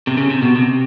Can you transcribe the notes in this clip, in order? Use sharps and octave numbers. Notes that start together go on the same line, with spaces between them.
C3
C#3
C3
B2
C3